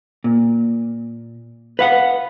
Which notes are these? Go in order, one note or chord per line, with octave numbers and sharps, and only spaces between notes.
A#2
B4 F5 F#5